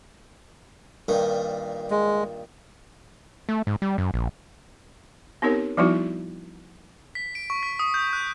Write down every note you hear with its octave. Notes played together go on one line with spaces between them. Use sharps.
G2 A#2 D#3
G#3
A3
G#2
G3
F#2
A#1
B3 C4 D#4 G4 A#4 C#5
F3 G3 B3 D#4 E4 F#4
B6
D7
C#6
B6
D#6
G6
F#6